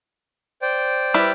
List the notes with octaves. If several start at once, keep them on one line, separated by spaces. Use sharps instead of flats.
C5 D5 G5
G3 E4 B4